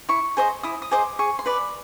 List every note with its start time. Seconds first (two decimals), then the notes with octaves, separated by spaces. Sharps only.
0.09 E4 C#6
0.37 G#4 C5 D#5
0.63 E4 D#6
0.82 D#6
0.91 G#4 C5 D#5 D6
1.19 G#4 C#6
1.39 C6
1.46 B4 D5 B5